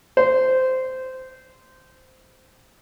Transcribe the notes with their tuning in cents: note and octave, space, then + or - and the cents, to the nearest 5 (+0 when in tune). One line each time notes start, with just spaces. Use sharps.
C5 -15